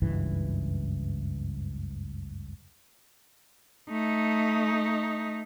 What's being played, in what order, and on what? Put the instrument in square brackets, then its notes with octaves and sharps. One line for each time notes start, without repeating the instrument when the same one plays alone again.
[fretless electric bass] F#1 C#2 G2 E3
[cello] A3 D#4